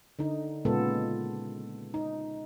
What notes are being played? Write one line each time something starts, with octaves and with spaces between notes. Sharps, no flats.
D3 D#4
A#2 C#3 G#3 B3 F4 A4
D#4